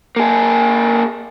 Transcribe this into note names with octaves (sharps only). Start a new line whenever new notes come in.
A#3 G#4